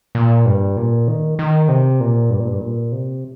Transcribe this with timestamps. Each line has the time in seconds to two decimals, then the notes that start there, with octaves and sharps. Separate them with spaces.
0.15 A#2
0.46 G2
0.77 A#2
1.08 D#3
1.39 D#3
1.69 C3
2.00 A#2
2.30 G2
2.40 A#2
2.48 G2
2.61 A#2
2.92 C3